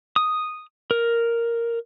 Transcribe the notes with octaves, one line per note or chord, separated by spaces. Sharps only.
D#6
A#4